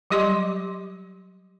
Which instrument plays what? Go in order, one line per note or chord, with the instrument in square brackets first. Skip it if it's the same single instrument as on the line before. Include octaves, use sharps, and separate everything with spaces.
[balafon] F#3 G3 G4 D#5 C6 D6